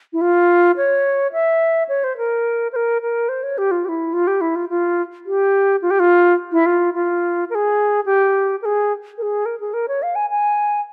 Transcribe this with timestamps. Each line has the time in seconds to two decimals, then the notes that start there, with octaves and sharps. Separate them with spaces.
0.13 E4
0.21 F4
0.77 C#5
1.33 E5
1.89 C#5
2.04 C5
2.17 A#4
2.73 C5
2.76 A#4
3.02 A#4
3.29 C5
3.43 C#5
3.58 G4
3.71 F4
3.85 G4
3.89 E4
4.13 F4
4.27 G4
4.41 E4
4.55 F4
4.69 F4
5.26 G4
5.82 F4
5.90 G4
5.99 F4
6.52 E4
6.66 F4
6.94 F4
7.50 A#4
7.55 G#4
8.06 G4
8.62 A#4
8.65 G#4
9.18 A#4
9.22 G#4
9.46 A#4
9.60 G#4
9.74 A#4
9.88 C#5
10.02 F5
10.15 G#5
10.30 G#5